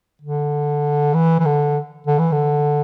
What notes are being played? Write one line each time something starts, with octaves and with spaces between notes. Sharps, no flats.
D3
E3
E3
D3
D3
E3
D3